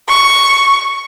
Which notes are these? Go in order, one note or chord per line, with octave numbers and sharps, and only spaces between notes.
C#6